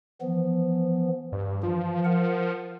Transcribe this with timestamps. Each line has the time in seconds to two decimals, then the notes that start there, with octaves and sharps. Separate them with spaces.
0.21 E3 F3 B3
1.32 G2
1.63 E3 F3
2.05 A#4 F#5